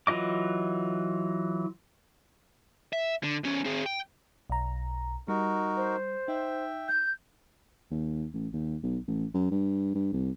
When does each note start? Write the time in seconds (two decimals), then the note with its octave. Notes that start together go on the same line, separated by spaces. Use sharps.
0.07 E3 F#3 F4 D#5 D6
2.93 E5
3.23 D3
3.44 E2 C#4
3.65 C4 G#4
3.86 G5
4.50 B1 A#5
5.28 G3 D#4 F#4 A#4
5.76 C5
6.28 D#4 E5 G5
6.88 G6
7.91 D#2
8.34 A1
8.53 D#2
8.83 B1
9.08 A1
9.34 F#2
9.51 G2
9.95 G2
10.13 C2